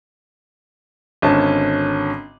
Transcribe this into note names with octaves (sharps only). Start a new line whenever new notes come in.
G#1 D3 C#4 A5